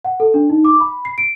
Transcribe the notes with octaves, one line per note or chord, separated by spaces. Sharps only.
F#5
A4
D4
D#4
D6
B5
C7
D7